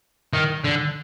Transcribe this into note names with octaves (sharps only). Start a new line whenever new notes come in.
D#3
D3